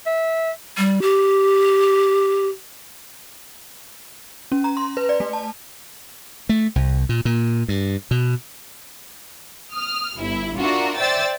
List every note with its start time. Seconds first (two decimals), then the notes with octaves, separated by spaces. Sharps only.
0.07 E5
0.78 G3
1.02 G4
4.52 C#4
4.64 A#5
4.77 C6
4.97 B4
5.09 D5
5.20 A3
5.33 A5
6.49 A3
6.76 C2
7.09 A#2
7.25 A#2
7.68 G2
8.11 B2
9.73 D#6 F6
10.16 G1 E4
10.57 D4 F4 F#4 A#4 E5
10.96 C5 D5 E5 G5 E6 A6